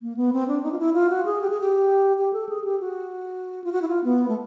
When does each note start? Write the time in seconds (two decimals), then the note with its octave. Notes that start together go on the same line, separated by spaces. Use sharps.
0.02 A#3
0.17 B3
0.33 C4
0.48 D4
0.63 D#4
0.72 F4
0.79 E4
0.94 F4
1.10 F#4
1.25 G#4
1.41 G4
1.50 G#4
1.61 G4
2.18 G4
2.33 A4
2.49 G#4
2.64 G4
2.80 F#4
3.64 F4
3.72 F#4
3.82 E4
3.88 F4
4.04 B3
4.28 A3